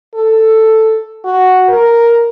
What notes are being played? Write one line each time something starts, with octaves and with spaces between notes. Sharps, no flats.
A4
F#4
A#4